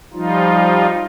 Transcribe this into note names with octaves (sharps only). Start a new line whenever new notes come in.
F3 G3 D#4 F4